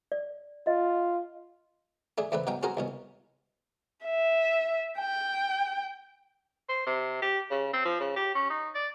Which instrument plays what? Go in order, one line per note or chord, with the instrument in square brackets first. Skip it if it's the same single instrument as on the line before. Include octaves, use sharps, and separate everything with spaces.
[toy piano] D5
[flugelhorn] F4 [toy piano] D#5
[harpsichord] A3 D4 G#4
C#2 A3 C4 D4 B4
B2 F#3 C#4 G5
C4 C#4 F#4 G#4 A#4 C5
C2 B2 C#4
[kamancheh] E5
G5
[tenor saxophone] C5
C3
G4
C#3
C4
F3
C#3
G4
C#4
D#4
D5